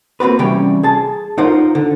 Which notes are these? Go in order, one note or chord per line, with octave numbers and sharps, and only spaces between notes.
A#3 C4 F#4 B4
C3 E3 G3 C#4 G5
G#4 A5
D#4 F4 A#4 C5 F#5
D3